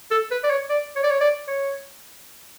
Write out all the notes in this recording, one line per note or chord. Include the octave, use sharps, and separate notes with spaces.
A4
B4
D5
C#5
D5
C#5
D5
C#5
D5
C#5